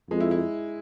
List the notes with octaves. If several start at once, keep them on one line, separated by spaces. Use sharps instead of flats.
F2 G#3
E4
E4